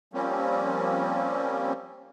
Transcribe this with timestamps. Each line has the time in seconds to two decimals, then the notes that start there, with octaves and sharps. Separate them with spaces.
0.13 F3 G3 A#3 C4 C#4